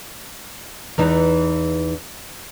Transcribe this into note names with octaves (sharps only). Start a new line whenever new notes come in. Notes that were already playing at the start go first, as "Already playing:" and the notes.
E2 E3 D#4